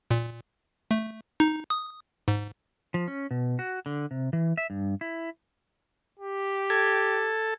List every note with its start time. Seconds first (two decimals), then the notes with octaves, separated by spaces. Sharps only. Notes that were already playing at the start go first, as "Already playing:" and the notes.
0.11 A#2
0.91 A3
1.40 D#4
1.70 D#6
2.28 G#2
2.94 F3
3.08 C#4
3.31 B2
3.59 F#4
3.86 D3
4.11 C3
4.33 E3
4.57 E5
4.70 G2
5.01 E4
6.19 G4
6.70 A4 G#6